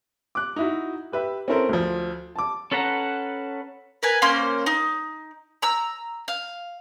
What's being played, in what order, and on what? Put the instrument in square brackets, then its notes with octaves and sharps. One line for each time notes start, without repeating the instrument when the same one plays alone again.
[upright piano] D6 F#6
D#4 E4 F#4
G4 B4 E5
C4 C#4 E4 A4 A#4 C5
D2 F3
A5 D6
[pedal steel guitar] C#4 A4 B4 F#5 A#5
[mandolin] A#4 B4 G#5
A#3 C#4 C5 C6
D#4
A#5 E6
F5